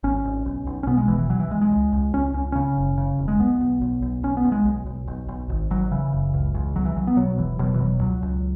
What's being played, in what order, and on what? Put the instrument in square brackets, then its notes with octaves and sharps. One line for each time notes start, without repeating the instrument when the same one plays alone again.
[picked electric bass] G#1 C#4
G#1
B1
B1
C#4
B2 B3
G#3
E1 E3
E3
B1 F#3
E3
B1 G#3
G#3
C#2
C#2
C#2 C#4
C#2 C#4
C#3 C#4
F#1
C#3
E1
G#3
B1 B3
B1
B1
B1
B1 C#4
B3
B1
G#3
B1
B1
B1
B1
G#1
G#1 F#3
C#3 E3
F#1
C#2
C#2
B1 F#3
E3
B1 F#3
B3
B2 F#3
E1 E3
B2 F#3
E3
E1 F#3
C#2 F#3
C#2